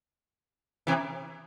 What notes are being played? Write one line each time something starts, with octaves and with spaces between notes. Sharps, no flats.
C3 E3